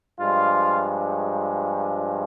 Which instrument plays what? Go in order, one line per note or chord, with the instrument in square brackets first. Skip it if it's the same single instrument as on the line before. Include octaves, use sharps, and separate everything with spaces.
[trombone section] G2 F3 G#3 F4